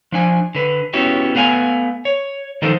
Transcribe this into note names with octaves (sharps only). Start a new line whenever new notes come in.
F3 D4 G#5
D3 B4
B3 C#4 E4 F#4 G4
A3 B3 F5 G5 G#5
C#5
D#3 F3 D#4 A4 C5